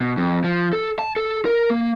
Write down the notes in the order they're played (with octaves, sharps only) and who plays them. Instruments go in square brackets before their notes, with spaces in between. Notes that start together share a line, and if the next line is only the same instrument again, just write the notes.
[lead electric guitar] B2
F2
F3
A4
A5
A4
A#4
A#3